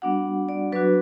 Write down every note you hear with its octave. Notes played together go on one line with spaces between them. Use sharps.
G3 B3 D4 F#4 F#5
D5
F#3 B3 D4 F#4 B4